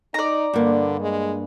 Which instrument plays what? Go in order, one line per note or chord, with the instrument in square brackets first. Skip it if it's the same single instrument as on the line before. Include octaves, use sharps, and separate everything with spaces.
[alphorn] D#4 [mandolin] D5 A#5
[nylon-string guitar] G2 A#3 [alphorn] D3
[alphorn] G#3